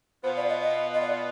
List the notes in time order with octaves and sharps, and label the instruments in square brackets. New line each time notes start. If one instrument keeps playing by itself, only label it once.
[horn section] B2 B3 F4 [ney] C5
[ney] D5
D#5
D#5
D#5
D5